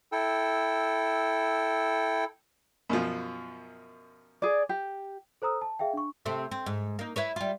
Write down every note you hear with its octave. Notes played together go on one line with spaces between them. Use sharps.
E4 A4 G5
F#2 B2 F3
G#4 D5
G4
A4 C5 A#5 D#6 E6
A5
G#4 E5 F5 G5
D4 C#6
C3 A3 C4
C4
G#2
A#3 D#4
E4 B4 C#5
G3 F4